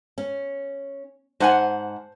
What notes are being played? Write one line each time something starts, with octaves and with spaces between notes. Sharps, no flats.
C#4
G#2 C5 F#5 G#5 A5